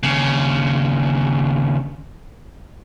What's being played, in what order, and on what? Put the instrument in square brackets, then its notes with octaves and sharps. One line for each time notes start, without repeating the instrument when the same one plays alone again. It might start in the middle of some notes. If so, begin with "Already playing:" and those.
[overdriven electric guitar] D#2 C#3